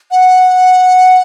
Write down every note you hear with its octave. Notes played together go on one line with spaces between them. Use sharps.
F#5